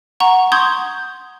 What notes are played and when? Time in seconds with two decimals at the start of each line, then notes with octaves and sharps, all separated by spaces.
0.20 F#5 A#5 C#6
0.52 C6 C#6 D#6 G6 G#6